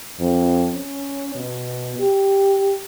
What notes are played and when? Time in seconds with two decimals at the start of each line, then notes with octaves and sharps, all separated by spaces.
0.20 F2
0.74 C#4
1.35 B2
1.99 G4